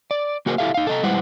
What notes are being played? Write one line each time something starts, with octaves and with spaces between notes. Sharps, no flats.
D5
A#3 F#4 G#4 A#4 C5
E4 G4 A4 E5 F5
D#4 F5
A4 D#5 A#5
G3 G#3 E4 B4 C5 F#5